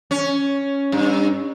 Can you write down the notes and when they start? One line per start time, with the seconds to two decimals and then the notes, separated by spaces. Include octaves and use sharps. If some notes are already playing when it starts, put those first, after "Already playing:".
0.11 C#4
0.92 G2